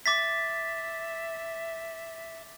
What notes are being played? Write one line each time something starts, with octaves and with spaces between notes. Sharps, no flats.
E5 D6 A6 B6